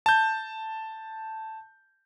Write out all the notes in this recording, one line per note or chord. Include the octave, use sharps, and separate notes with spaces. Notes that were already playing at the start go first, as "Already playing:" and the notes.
A5 G6